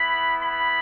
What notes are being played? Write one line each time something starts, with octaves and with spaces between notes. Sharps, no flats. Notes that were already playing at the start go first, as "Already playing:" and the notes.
Already playing: B3 E4 B5
B5